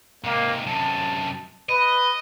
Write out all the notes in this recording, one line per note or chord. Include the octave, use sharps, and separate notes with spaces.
G#2 C3 A#3
F#2 C3 A5
B4 D#5